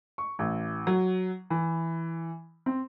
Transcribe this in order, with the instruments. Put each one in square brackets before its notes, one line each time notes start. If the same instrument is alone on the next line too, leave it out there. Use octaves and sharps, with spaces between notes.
[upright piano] C#6
A1
F#3
E3
C4